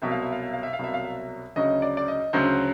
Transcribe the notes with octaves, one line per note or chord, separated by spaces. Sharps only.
C2 B2 F#3 E5
F5
E5
F5
E5
F5
E5
F5
C2 B2 F#3 E5
F5
E5
D2 C#3 F#3 D#5
D5
D5
D#5
D2 C#3 F#3 C5